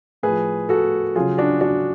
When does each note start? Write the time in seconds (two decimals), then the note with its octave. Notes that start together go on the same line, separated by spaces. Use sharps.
0.23 A2 F3 G#4 B4
0.69 F#4 A4
1.15 C#3 F#3 F4 G#4
1.38 D4 F#4
1.61 D4 F#4